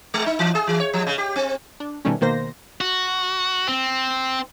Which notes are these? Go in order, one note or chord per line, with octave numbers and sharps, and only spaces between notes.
G#3
D#4
E3
G#4
E3
C#5
F3
C#3
G4
C4
D4
B2 D#3 G3 A3 C#4
B2 D#3 A#3 C5 A#6
F#4
C4